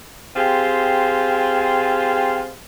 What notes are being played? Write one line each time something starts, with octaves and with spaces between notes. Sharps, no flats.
C4 F4 G4 G#4